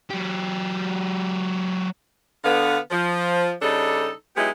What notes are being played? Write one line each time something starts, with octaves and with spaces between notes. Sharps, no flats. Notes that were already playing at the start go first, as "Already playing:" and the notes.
F#3 G4
D3 B3 F5
F3
C#3 G3 D4 D#4 A4
F#3 G#3 B3 D#4 E4 G4